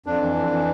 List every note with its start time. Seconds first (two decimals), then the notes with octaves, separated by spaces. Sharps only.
0.06 F2 D4
0.21 E3
0.36 F2
0.51 E3